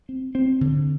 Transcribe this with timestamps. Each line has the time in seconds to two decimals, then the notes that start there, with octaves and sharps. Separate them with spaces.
0.09 C4
0.35 C4
0.61 D3